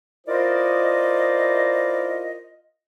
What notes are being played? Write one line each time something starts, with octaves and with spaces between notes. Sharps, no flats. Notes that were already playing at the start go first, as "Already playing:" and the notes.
E4 F4 A#4 C5 D5 D#5